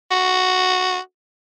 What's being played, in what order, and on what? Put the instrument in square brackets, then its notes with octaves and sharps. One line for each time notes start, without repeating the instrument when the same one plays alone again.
[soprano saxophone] F#4